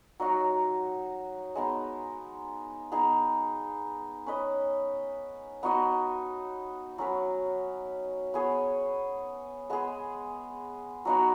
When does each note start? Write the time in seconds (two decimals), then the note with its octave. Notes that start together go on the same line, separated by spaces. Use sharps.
0.20 F#3 D#4 F#4
1.55 G#3 B3 D#4
2.92 B3 D#4 G#4
4.26 C#4 B4 D#5
5.63 B3 D#4 F#4 D#5
6.98 F#3 C#4 B4
8.34 B3 G#4 C#5
9.70 G#3 B3 G#4
11.05 F#3 B3 D#4 F#4